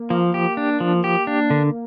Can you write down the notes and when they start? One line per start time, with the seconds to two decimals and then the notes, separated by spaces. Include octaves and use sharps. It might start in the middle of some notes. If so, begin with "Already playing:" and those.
Already playing: A#3
0.10 F3 A#3
0.34 G4
0.57 D4
0.80 F3
1.04 G4
1.27 D4
1.50 D3